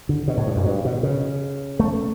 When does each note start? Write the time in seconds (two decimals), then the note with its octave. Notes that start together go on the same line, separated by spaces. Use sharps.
0.09 D3
0.28 B2
0.37 A2
0.47 G2
0.56 F#2
0.65 G2
0.85 B2
1.03 C#3
1.79 A3